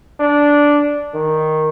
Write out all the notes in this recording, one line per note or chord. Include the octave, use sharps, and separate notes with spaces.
D4
D#3